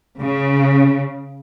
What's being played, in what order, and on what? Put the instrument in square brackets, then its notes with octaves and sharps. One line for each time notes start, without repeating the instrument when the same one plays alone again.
[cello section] C#3